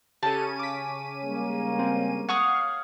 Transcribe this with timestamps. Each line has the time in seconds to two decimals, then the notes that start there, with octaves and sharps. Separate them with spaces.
0.23 C#3 C#4 G4 A4 A5 D#7
0.59 D6 B6
1.24 G3 G#3 A#3
1.79 C4
2.29 C#5 F5 F#5 C#6 D#6